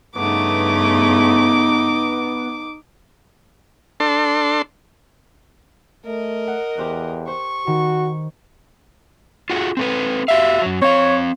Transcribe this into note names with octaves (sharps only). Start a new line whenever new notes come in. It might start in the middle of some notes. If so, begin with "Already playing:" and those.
G2 C#3 A3 B3 D#4 D6
D4 A4 C6
A3 A#4 D#5
F#5
E2 G4 C5 F#6
C5 C#6
D#3 F#4
F4 F#4 G#4
C4 A4 B4
F#4 G4 E5 F5
F#2 F#3
C4 C#5 F5